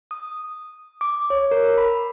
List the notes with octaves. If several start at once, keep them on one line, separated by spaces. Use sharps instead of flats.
D#6
D6
C#5
A#4
B5